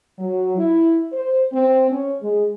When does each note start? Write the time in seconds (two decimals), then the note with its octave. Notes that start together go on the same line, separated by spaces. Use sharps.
0.19 F#3
0.58 E4
1.13 C5
1.52 C4
1.90 C#4
2.22 G#3